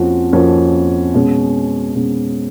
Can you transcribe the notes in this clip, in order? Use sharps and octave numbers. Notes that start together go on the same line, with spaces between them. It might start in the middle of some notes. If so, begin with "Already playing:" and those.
Already playing: F2 F3 A#3 C#4 F#4
F2 F3 A#3 C#4 F#4
B2 G#3 C#4
B2 G#3 C#4